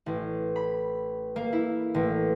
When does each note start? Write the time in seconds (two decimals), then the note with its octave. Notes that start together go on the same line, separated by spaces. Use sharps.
0.06 A1
0.56 B5
1.36 A#3
1.53 E4
1.94 A1